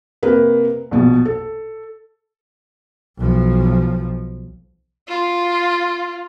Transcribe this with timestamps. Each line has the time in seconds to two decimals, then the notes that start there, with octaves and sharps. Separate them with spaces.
0.23 C3 A#3 B4
0.91 A#1 B2
1.25 A4
3.18 B1 F3
5.08 F4